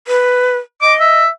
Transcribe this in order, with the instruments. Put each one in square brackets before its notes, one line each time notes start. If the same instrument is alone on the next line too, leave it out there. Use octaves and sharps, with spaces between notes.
[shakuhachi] B4
[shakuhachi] D#5 [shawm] D6
[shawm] E5